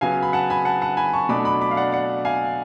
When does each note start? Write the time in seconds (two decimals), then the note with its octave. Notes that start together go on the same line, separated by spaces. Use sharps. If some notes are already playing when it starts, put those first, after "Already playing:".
0.01 C#3 F#3 B3 F5 G#5
0.23 B5
0.33 F#5 A5
0.50 G#5 B5
0.65 F#5 A5
0.81 F#5 A5
0.97 G#5 B5
1.13 A5 C#6
1.29 B2 F#3 A3 D4 B5 D6
1.45 B5 D6
1.61 B5 D6
1.71 F5
1.77 D5 F#5
1.92 D5 F#5
2.25 F5 G#5